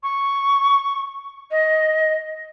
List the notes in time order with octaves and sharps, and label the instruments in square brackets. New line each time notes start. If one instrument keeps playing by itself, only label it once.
[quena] C#6
D#5